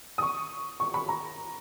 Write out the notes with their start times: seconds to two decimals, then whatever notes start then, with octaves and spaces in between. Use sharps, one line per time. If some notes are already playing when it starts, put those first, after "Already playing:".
0.18 D#6
0.23 C#6
0.80 C#6
0.94 B5
1.09 A#5